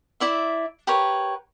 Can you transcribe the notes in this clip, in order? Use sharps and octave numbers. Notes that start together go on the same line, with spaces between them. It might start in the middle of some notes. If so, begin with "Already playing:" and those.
E4 D5 E5
G4 A#4 B4 C#5